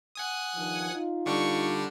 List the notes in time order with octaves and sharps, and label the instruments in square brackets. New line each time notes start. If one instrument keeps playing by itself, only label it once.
[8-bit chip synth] F#5 G#5 D#6
[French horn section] G2 D#3 F3
D#4 F4
[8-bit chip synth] D3 G3 D4 [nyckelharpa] C#6